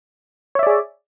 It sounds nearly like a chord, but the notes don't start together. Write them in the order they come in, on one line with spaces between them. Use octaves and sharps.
C#5 E5 D5 G#4